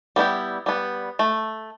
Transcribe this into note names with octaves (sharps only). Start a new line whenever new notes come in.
G3 B3 E4 G4
G3 B3
A3